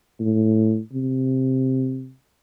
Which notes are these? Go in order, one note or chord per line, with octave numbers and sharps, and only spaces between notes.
A2
C3